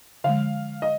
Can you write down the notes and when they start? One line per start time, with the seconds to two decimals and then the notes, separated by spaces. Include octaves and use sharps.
0.24 D3 F3 G#3 F5
0.82 D#5